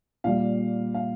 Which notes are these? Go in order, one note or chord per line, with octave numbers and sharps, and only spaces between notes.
A#2 G3 F5
F5